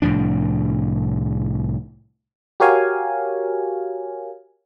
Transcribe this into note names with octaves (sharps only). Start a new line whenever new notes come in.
C2 A2 F3 D4
F#4 G4 A#4 C#5 F5 G#5